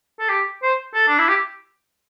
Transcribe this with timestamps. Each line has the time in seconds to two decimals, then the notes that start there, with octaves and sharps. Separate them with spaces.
0.20 A4
0.29 G4
0.63 C5
0.94 A4
1.08 D4
1.18 E4
1.28 G4